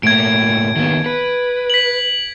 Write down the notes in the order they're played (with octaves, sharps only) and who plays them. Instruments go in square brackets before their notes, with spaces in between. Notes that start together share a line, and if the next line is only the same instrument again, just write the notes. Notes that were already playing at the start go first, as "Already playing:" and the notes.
[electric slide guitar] A2 A3 A#3 [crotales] G#6 D7
[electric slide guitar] D#3 A#3 B3
B4
[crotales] B6 F#7